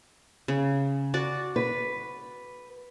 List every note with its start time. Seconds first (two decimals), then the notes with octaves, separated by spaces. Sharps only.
0.48 C#3
1.14 F#4 D5
1.56 B4